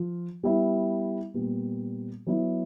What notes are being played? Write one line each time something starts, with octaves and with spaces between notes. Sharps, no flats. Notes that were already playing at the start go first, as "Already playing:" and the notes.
Already playing: F3 F4
G3 B3 E4
A#2 G3 B3
F#3 B3 E4